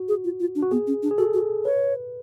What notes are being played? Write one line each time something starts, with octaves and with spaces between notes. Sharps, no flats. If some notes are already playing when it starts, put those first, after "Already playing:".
Already playing: F#4
G#4
F4
F4
D4
F#4
B3 G#4
C#4
D4
G#4
F#4 A4
F#4
B4 C#5